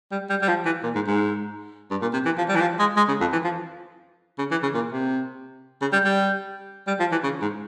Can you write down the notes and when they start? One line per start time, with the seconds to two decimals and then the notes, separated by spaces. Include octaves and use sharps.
0.12 G3
0.30 G3
0.42 G3
0.48 F3
0.65 E3
0.83 A#2
0.95 G#2
1.07 G#2
1.91 G2
2.01 A#2
2.13 C3
2.26 E3
2.38 F3
2.49 G3
2.56 E3
2.61 F3
2.79 G#3
2.97 G#3
3.08 C#3
3.20 F2
3.33 E3
3.44 F3
4.38 C#3
4.51 E3
4.63 C#3
4.75 A#2
4.93 C3
5.82 C#3
5.93 G3
6.05 G3
6.87 G3
7.00 F3
7.12 E3
7.23 C#3
7.42 G#2